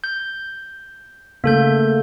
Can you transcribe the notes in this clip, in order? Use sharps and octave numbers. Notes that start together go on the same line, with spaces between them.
G6
C#3 A3 A#3 A4 G6